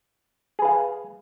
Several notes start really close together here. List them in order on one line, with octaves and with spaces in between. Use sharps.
G#4 B4 F5